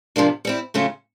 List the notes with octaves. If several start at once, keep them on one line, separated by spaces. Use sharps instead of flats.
C3 F3 A#3 D4
G3 C4 E4
C#3 F#3 A3 C#4 F4